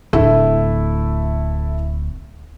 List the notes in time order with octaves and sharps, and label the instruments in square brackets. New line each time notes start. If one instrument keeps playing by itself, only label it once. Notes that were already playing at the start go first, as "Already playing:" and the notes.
[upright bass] D1 [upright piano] A3 E4